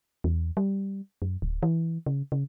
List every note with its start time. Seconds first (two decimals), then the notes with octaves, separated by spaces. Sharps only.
0.24 E2
0.57 G3
1.22 F#2
1.42 D1
1.63 E3
2.06 C#3
2.32 C#3